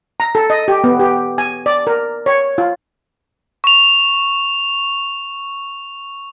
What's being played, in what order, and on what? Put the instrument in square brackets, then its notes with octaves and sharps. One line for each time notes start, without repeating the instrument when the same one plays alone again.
[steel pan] A#5
A4
D#5
G4
B3
G4
G#5
D5
A#4
C#5
F4
[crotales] C#6 F7